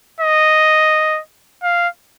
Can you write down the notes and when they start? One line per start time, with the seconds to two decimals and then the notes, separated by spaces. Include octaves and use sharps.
0.20 D#5
1.63 F5